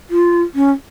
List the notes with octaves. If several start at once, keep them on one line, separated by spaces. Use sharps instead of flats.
F4
C#4